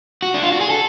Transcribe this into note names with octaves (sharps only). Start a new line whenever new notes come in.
F#4
D4
F4
F#4
G#4
A4